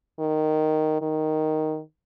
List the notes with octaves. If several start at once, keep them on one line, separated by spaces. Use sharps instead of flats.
D#3
D#3